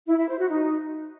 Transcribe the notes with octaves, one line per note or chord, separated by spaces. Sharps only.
E4
E4
C5
F#4
D#4